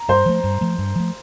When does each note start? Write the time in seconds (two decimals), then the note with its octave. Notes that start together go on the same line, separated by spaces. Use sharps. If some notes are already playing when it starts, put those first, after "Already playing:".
Already playing: A#5
0.09 G2 C5
0.26 F3 A3
0.44 G2
0.61 F3 A3
0.78 G2
0.96 F3 A3